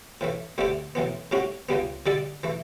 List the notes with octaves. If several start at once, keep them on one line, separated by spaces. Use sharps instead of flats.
A2 E3 A3
D2 D3 A3 D4 G4
B1 A2 E3 B3
A2 G3 C#4 F#4
C#2 C#3 G3 B3
D3 G3 D4 A4 D5
E3 A3